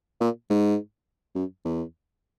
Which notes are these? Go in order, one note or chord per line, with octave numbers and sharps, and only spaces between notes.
A#2
G#2
F#2
E2